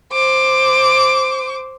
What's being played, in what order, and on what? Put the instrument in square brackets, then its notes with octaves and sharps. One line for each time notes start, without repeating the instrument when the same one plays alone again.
[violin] C5 D6